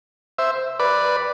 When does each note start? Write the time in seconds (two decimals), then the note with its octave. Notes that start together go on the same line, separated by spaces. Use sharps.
0.38 C5 E5
0.79 B4 D5